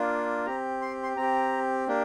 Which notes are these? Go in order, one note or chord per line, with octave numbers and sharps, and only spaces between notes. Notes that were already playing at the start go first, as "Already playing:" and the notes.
Already playing: A#3 D4 F4
C4 G4 A#5
C6
C6
C4 G4 A#5
A#3 D4 G4